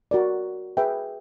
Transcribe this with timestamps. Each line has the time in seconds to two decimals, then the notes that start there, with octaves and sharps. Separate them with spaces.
0.11 F#4 A#4 D5
0.77 G#4 B4 E5 G5